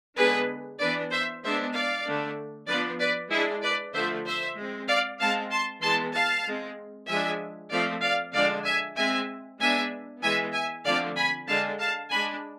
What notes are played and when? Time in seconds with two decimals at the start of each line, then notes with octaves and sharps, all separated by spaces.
0.17 D3 G#3 B3 D4 G#4 B4
0.80 E3 B3 D4 B4 D5
1.11 C5 E5
1.42 G#3 B3 D4 C5 E5
1.74 D5 F5
2.05 D3 A3 D4
2.68 F3 B3 D4 B4 D5
2.99 B4 D5
3.30 G#3 D4 E4 G#4
3.62 B4 D5
3.94 D3 F3 A3 C5 E5
4.25 C5 E5
4.57 G#3 C4
4.88 D5 F5
5.19 G#3 C4 F5 A5
5.51 A5 C6
5.82 E3 G#3 B3 A5 C6
6.14 F5 A5
6.45 G#3 C4
7.08 F3 G#3 D4 E5 G#5
7.71 F3 A3 C4 D5 F5
8.02 D5 F5
8.33 D3 F3 G#3 D4 D5 F5
8.64 E5 G#5
8.96 G#3 C4 E5 G#5
9.59 G#3 B3 D4 E5 G#5
10.22 E3 G#3 B3 E5 G#5
10.53 E5 G#5
10.85 D3 F3 A3 C4 D5 F5
11.16 G#5 B5
11.48 D3 G#3 D4 F5 A5
11.79 F5 A5
12.10 G#3 D4 G#5 B5